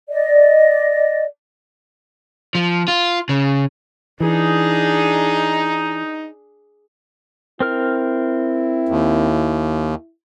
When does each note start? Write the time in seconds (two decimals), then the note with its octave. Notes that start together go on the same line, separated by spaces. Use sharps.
0.09 D5 D#5
2.55 F3
2.88 F4
3.29 C#3
4.20 E3 D4 D#4 G#4
7.60 C4 E4 A#4 F6
8.89 D#2